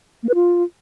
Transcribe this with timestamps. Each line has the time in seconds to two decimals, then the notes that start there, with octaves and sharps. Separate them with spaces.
0.23 A#3
0.29 B4
0.35 F4